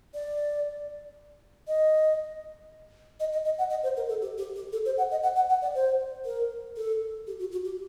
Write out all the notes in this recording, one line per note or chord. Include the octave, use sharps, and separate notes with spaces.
D5
D#5
D#5
D#5
D#5
F#5
D#5
C5
A#4
A4
G4
G4
G4
A4
C5
F#5
D#5
F#5
F#5
F#5
D5
C5
A#4
A4
G4
F#4
F#4
G4